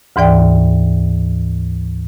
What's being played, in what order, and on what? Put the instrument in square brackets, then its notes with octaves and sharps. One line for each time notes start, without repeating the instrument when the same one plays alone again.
[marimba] D2 G#2 E3 D5 G5